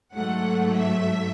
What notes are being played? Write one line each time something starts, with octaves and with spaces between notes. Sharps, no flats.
G#2 F#3 A3 F#5
E5